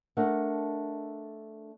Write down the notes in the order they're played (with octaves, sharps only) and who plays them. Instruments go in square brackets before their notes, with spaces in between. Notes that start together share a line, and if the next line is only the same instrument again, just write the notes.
[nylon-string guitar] A3 D4 A4 A#4 D#5 F#5